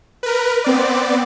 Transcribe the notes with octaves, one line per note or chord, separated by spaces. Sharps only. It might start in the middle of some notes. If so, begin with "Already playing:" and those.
A#4 B4
B3 C4 D5